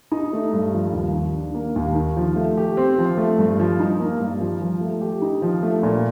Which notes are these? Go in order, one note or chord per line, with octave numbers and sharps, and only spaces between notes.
D#4
A3
G2
F3
D#2
D#3
D4
A#3
D#2
D#3
F3
A3
G4
C4
F3
A3
G2
F3
D#4
A#3
G2
F3
F3
A3
G4
D#4
F3
A3
A#2